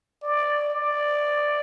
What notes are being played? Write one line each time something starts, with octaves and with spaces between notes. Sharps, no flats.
D5
D5